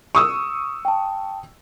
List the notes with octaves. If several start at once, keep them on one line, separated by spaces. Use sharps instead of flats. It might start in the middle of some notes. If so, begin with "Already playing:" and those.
C#6 D#6 E6
G5 A5